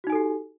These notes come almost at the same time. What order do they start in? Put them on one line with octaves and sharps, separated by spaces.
F#4 D#4 G#5 A4 G4